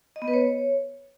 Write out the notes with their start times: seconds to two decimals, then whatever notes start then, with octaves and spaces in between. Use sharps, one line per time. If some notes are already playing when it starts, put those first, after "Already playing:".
0.16 D#5
0.22 B3
0.28 B4
0.34 C#5